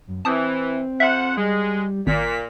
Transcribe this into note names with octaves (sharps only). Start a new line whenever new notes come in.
F#2
E3 C4 A5 D#6 G6
F2 C5 E5 F#5
G3 G#3
G#1 A#2 B6